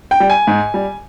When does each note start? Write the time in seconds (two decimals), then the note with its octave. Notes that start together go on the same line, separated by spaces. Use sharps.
0.11 G5
0.20 G3
0.30 G#5
0.47 G#2
0.74 G3